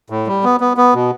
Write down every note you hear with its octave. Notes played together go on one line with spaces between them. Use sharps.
A2
G3
B3
B3
B3
B2